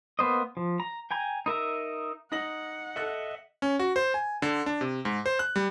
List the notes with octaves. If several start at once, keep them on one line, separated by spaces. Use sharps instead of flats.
A#3 B3 C5 D#5
F3
A#5
G5 G#5 A#5
D#4 A#4 E5 A#5
D#4 F#5 A#6 F#7
A4 D#5 E5 F#6
C#4
F#4
C5
G#5
D3
D4
C3
G#2
C5
F#6
G3